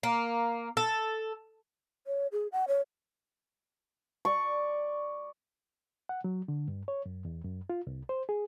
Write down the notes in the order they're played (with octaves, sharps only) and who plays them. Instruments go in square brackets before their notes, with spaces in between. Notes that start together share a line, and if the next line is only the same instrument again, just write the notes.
[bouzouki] A#3
A4
[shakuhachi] C#5
G#4
F#5
C#5
[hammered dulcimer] D5 C#6
[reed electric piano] F#5
F#3
D3
G2
C#5
F#2
E2
F#2
F4
C2
C5
G#4